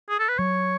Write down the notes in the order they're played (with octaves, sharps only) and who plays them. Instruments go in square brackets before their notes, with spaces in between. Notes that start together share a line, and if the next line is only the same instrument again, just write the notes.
[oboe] G#4
A4
B4
[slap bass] F#3 [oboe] C#5